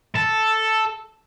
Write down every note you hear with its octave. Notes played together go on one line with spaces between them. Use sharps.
A4